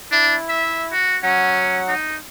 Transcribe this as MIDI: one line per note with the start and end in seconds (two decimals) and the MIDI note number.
0.11 0.35 62
0.11 0.93 64
0.49 0.84 76
0.92 1.17 66
1.23 1.94 54
1.23 1.79 61
1.23 1.94 78
1.88 2.17 63